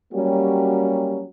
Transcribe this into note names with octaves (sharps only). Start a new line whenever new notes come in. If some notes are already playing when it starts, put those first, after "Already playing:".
F#3 G3 A#3 C#4 F#4 G4